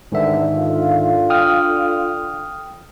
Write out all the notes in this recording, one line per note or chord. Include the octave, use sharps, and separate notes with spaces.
E2 G#2 D3 D#3 E5
D3 F4
G5 D#6 F6